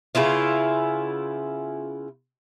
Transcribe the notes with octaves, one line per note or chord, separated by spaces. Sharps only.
C#3 B3 E4 F4